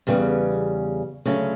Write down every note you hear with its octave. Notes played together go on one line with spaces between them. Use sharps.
E2 C#3 G3 B3
D2 C#3 F#3 A3 C#4